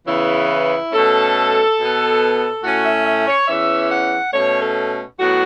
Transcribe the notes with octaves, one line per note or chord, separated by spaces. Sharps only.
E2 C#3 E3 B3 E4
B2 A3 C#4 A4
B2 B3
A2 A3 C#4 F#4
E5
E5
C#5
E2 E3 C#4 E5
F#5
B2 A3 C#4 C#5
A4
A2 F#3 B3 F#4